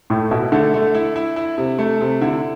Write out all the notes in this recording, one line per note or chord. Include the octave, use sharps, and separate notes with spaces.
A2 A3
B2 E4
D3 A3
A3
E4
E4
E4
C3
A3
C3
D3 E4